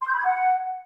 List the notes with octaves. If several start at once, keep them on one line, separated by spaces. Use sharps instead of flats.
C6
G6
B5
G#6
F#5